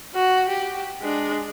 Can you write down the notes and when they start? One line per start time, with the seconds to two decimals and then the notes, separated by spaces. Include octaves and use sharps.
0.15 F#4
0.49 G4
1.02 G#3 D4